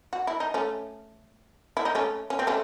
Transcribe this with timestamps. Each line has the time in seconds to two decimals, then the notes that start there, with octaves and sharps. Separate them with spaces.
0.13 F#4
0.27 E4
0.40 D#4
0.54 A3 C#4
1.77 E4
1.85 D#4
1.95 A3 C#4
2.30 C#4
2.39 C4
2.47 A3 C#4